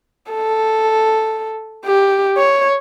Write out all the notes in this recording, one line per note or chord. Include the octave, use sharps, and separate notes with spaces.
A4
G4
C#5